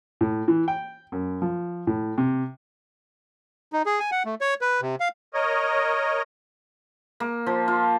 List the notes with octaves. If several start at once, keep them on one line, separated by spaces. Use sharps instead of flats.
A2
E3
G5
F#2
F3
A2
C3
D#4
G#4
G#5
F#5
A3
C#5
B4
C3
F5
A#4 C#5 D#5
A#3
F3
F4